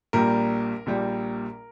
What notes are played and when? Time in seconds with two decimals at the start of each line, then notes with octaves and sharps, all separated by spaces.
0.13 A#1 A#2 G3 A#4
0.86 A#1 A#2 G3